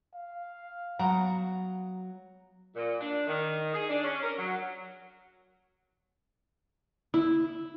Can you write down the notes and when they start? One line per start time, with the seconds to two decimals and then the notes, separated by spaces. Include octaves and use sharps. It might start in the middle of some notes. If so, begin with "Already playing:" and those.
0.14 F5
0.99 F#3 B3 F#5 A#5
2.75 A#2
3.00 D4
3.27 D#3
3.74 G#4
3.88 D4
4.04 C#4
4.21 A#4
4.37 F#3
7.14 E4